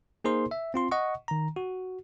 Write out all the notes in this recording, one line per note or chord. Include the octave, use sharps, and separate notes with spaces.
A#3 D#4 G#4 A#4 C5 C6
E5
C4 F4 C6
D#5 F#5 C#6
D#3 A#5
F#4